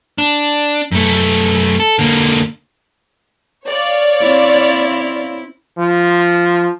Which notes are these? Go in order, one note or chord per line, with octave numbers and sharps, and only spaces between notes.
D4
F#2 A3
A4
D3 A#3
C#5 D5 F5
C4 C#4 E4
F3